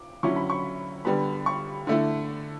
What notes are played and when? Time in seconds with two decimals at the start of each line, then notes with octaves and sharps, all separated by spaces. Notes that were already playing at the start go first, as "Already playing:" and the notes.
Already playing: D6
0.23 D3 F#3 C#4 E4 C#6
0.36 B5
0.50 C#6
1.05 D3 G3 B3 B5
1.46 C#6
1.87 D3 A3 E4